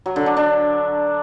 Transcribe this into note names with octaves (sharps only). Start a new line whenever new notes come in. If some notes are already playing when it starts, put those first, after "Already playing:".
F#3
D3
D4
D4